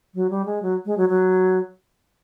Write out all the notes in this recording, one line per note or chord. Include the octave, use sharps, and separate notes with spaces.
F#3
G3
G#3
F#3
G#3
F#3
F#3